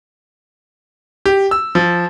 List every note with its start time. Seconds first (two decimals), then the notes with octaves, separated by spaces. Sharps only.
1.26 G4
1.51 E6
1.75 F3